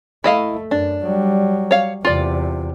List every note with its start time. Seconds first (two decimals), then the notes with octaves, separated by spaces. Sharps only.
0.24 A3 E4 D#5 F5
0.71 F#2 D4
1.03 F#3 G3
1.71 C#5 F5
2.05 E2 C3 F4 D5